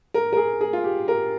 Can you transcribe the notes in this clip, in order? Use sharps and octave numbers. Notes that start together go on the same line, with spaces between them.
A#4
A#4
G#4
G#4
F4
G4
A#4